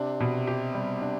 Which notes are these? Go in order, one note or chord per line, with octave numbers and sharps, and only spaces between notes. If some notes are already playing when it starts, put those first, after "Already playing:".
Already playing: C3 D4
B2
G4
G3
D4